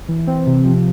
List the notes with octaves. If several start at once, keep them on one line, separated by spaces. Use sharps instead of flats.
E3
C4
C3
F3